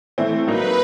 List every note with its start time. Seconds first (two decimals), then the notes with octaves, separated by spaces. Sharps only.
0.18 E3 A3 C4
0.47 F#3 A#3 D#4 B4